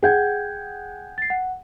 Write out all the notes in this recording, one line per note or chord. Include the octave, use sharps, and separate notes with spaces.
G#4 F#5 G5 G6 G#6
A6 C7
F#5